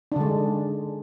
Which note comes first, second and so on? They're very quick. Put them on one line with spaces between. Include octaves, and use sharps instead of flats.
D4 D3 G#3